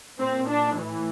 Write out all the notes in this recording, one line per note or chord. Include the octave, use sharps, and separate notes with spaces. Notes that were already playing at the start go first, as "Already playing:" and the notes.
A#2 C4
D4
A2 E3